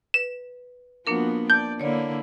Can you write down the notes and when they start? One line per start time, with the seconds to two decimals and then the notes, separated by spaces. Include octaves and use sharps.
0.14 B4 E7
1.07 F3 A#3 B3 D4 F#4 A#4
1.50 D5 A5 G6
1.80 D3 A#3 E4 C#5 D5